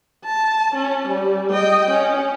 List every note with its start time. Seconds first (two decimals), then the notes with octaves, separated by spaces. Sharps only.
0.24 A5
0.75 C#4
1.08 G3
1.51 D#5 G5
1.90 C#4